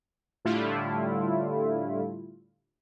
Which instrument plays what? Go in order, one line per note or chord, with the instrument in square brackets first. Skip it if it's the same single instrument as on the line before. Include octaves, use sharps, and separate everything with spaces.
[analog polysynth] A2 D3 G3 A3 E4 F4